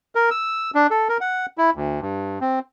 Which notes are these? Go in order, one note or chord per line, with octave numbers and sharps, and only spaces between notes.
A#4
E6
D4
A4
A#4
F#5
E4
D2
G2
C4